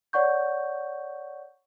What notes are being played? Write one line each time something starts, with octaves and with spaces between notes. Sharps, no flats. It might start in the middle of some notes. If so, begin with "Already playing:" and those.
C#5 D5 F#5 C#6 G6